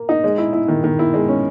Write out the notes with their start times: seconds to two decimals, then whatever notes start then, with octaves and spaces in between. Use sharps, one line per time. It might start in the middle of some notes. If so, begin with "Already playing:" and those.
Already playing: A#3
0.09 D#4
0.24 G#3
0.38 E4
0.53 E4
0.68 D#3
0.84 D#3
0.99 E4
1.14 G#3
1.28 C#4